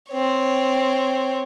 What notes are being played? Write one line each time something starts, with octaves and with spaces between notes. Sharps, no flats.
C4 C#5